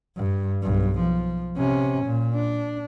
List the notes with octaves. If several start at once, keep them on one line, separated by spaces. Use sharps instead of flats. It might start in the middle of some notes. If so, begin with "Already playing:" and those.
G2
B1 G2
F3
C3 C#4
A#2
D4